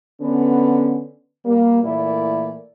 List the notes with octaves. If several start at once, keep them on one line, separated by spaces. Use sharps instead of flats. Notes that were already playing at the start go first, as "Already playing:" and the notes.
D3 B3 C#4
G3 A#3
A#2 E3 A3 E4 A#4 D5